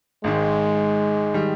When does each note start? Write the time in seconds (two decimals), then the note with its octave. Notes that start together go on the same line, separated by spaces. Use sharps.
0.24 G#1 G#2 D#3 G#3
1.34 D#3 G3